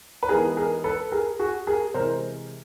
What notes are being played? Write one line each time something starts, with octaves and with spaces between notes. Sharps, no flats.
B4
E3 G#3 B3 D#4 G#4 A#4
G#4 A#4
A4 B4
G#4 A#4
F#4 G#4
G#4 A#4
C3 E3 G#3 A#4 C5